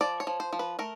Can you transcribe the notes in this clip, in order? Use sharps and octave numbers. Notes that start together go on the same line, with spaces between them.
F3 D5
C#5
F3
C5
F3
B4
A3 A#4